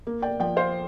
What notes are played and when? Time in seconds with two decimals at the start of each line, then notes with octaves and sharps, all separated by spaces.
0.07 A#3
0.22 D5 G5
0.40 F3 D5 G5
0.56 C5 F5